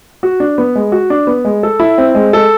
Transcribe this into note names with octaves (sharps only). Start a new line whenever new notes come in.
F#4
D4
B3
G#3
F#4
D4
B3
G#3
A4
E4
C4
G#3
A4